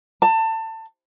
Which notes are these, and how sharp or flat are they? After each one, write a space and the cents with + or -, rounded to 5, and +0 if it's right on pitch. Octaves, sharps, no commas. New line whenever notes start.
A5 +25